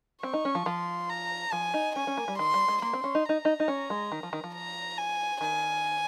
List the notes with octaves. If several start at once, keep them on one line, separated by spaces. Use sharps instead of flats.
C4 C#6
D#4
C#4
F3
F3 C6
A#5
F3 G#5
D#4
C#4 G#5
C#4
A#3
G3
D#3 C6
G3
G#3
A#3 C6
C4
C#4
D#4
D#4 A#5
D#4
D#4
C#4
G#3
D#3
F3
D#3
F3
A#5
G#5
D#3 G#5